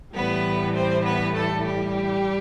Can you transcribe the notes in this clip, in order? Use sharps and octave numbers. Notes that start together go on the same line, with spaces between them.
A2 E3 G3 B3 B4
C4 C5
B3 B4
A3 A4
G3 G4